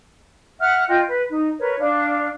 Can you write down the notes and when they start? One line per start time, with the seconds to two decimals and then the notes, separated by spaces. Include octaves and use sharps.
0.60 E5 F#5 F6 F#6
0.88 F4 D#5 G5
1.08 B4
1.29 D#4
1.59 A#4 B4 C#5
1.77 D4 F5